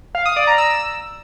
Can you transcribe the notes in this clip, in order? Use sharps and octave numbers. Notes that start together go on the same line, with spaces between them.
F5
D#6
D5
A#5
E6